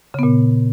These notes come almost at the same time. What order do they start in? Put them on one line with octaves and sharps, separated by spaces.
C#3 B3 A#2